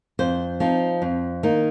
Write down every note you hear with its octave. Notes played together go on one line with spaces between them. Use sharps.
F2 C5
F3 C4 D#4
F2
D#3 A#3 D#4